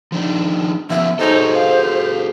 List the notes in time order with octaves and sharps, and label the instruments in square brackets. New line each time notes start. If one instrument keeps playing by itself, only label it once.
[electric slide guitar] F3 D4 D#4
[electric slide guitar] F3 B3 C#4 [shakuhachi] E5
[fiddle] D#4 C#5 [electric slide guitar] F#4 G#4 A4 [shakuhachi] C5
[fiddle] F5